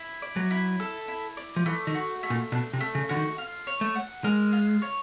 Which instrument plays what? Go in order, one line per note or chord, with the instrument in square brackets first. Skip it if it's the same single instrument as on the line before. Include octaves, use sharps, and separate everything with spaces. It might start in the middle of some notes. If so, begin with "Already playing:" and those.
Already playing: [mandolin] E4
D5
[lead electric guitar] F#3
[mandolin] E4
A4
E4
D5
[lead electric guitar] F3
[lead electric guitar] E3 [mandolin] A3
[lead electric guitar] D#3
[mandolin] F#4
A3
[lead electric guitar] A#2
[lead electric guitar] B2 [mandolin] D4
[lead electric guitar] C3
[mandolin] A3
[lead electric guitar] C#3
[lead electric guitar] D3 [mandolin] F#4
[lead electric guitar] D#3
[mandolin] F4
C#5
[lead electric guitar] A3
[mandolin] F#5
[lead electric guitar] G#3 [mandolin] A#4
[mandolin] F4
C#5